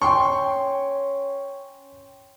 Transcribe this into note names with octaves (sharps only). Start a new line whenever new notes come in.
C#4 G5 C6 C#6